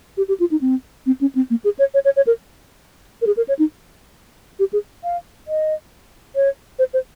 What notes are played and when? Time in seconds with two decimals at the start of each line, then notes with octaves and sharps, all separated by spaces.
0.17 G4
0.28 G4
0.40 F4
0.51 D#4
0.61 C4
1.06 C4
1.21 C#4
1.35 C4
1.50 A#3
1.64 G#4
1.79 C#5
1.94 C#5
2.05 C#5
2.16 C#5
2.27 A#4
3.22 A#4
3.26 G#4
3.37 A#4
3.48 C#5
3.59 D#4
4.59 G4
4.73 G#4
5.03 F5
5.47 D#5
6.35 C#5
6.79 C5
6.94 C5